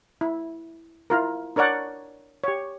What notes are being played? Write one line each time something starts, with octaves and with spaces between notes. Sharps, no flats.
E4
E4 F4 A#4
D4 A#4 C#5 D5 F#5
G4 C#5